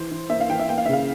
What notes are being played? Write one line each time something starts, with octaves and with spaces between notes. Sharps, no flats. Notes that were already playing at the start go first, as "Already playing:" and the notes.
Already playing: E3 C5
E3
A#3 E5
F5
E3 G5
E5
A#3 G5
F5
E5
C#3 F5